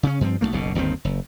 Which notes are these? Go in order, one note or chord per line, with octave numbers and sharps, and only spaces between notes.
C#3 C#4
G2 F3 C4
B1 E3 A3 A#3
F#1 B1 B2
G1 D#2 D#3 C4
F#1